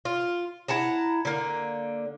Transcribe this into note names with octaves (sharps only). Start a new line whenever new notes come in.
F4
E4 F#5 A5 A#5
D3 A#3